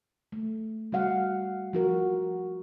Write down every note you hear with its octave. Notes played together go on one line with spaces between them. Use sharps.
A3
G3 F#4 F5 F#5
F3 F#4 A#4